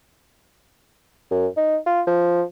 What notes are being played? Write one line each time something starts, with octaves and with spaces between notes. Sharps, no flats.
F#2
D#4
F4
F3